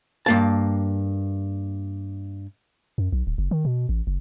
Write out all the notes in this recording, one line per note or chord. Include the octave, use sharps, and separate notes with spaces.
G2 A#3 A5
F#2
B1
D1
F#1
D#3
B2
A1
F#1